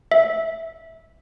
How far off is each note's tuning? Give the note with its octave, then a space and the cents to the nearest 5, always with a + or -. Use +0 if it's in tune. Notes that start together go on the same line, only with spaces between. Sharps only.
E5 -10